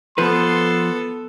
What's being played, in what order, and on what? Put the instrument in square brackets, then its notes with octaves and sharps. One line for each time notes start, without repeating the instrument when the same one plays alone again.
[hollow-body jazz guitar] F3 B4 [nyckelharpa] B3 A4 [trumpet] C6